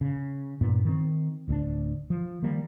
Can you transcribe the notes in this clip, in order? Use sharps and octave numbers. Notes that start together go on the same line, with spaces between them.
C#3
G2 A#2 B3
D#3 C4
D1 D2 C4 D4
F3
D#3 F3 G3 A#3